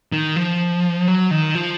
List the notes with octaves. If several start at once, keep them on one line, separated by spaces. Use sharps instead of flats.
D#3
F3
F#3
D#3
F3